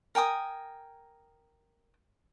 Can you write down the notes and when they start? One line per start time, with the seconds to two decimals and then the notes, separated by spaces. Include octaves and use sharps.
0.15 A#4 G5 G#5 D#6